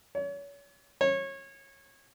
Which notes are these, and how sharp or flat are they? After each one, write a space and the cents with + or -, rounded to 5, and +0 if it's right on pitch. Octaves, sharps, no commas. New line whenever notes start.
C#5 +35
C#5 -25